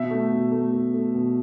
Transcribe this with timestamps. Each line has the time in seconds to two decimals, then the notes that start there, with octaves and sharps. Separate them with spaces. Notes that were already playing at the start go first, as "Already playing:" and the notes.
Already playing: B2 E5
0.11 A3
0.31 B2
0.52 A3
0.73 A3
0.94 A3
1.15 B2